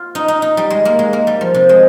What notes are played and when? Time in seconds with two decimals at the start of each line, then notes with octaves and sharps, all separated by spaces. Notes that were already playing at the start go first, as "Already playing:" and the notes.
Already playing: F4
0.15 D#4
0.28 D#4
0.42 D#4
0.57 G3
0.70 G#3
0.85 A#3
0.99 G#3
1.13 A#3
1.27 G3
1.41 F3
1.54 C3
1.69 G#3